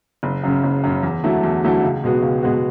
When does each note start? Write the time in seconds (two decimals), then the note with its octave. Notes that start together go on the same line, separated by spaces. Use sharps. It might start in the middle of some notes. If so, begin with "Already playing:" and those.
0.23 F#1
0.43 F#2 C#3
0.63 F#1
0.84 F#2 C#3
1.03 E2
1.23 D3 F#3 A3 E4
1.43 E2
1.64 D3 F#3 A3 E4
1.82 C#2
2.03 B2 G#3 B3 F#4
2.23 C#2
2.43 B2 G#3 B3 F#4